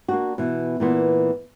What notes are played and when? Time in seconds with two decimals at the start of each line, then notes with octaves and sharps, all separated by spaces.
0.08 A#3 D4 F#4
0.38 B2 E3
0.80 A#2 E3 B3